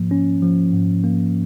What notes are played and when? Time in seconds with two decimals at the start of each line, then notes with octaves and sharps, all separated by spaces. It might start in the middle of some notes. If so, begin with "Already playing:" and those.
Already playing: G#2 F3 A#3
0.11 C#4
0.42 F3
0.73 G#2
1.04 A#3